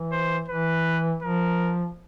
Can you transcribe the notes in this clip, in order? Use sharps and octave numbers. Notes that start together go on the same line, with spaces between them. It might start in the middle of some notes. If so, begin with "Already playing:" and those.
Already playing: E3
C5
E3 B4
F3 A#4